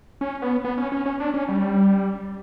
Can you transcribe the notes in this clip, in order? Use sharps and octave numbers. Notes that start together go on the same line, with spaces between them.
C#4
B3
B3
C#4
C#4
C#4
D4
C#4
G3